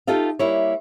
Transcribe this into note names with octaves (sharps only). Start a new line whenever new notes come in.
D#4 F4 G4 A4 D#5 F5
G3 A#3 E4 C#5